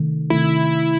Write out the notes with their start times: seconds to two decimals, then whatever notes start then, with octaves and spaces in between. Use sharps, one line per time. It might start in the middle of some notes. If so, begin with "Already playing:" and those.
Already playing: C3 D#3 A3
0.30 C3 D#3 A3 E4